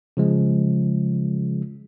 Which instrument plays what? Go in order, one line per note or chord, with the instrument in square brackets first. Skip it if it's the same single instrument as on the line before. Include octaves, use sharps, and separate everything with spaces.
[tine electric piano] C#3 F3 G#3